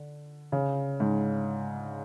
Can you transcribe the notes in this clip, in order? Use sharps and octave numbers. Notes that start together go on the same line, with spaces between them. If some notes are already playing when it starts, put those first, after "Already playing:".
Already playing: D3
C#3
G#2